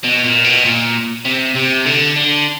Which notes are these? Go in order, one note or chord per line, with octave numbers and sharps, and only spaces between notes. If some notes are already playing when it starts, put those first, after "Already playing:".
B2
A#2
B2
A#2
C3
C3
D3
D3